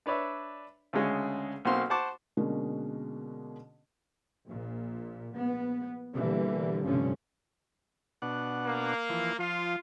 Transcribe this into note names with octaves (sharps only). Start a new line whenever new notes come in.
D4 B4 C#5 D5 E5
D2 C#3 G#3 C#4
B1 A#3 C4 F#4 C6 F6
C5 F#5 A5 C#6 D6
B2 D3 G#3 A#3 C#4
A#1 A#2
A#1 B3
B2 D3 E3 G3 A#3
F1 B1 G2 D3 F3 C#4
B2 D4 F#5
A#3
E3 F3
F3 F4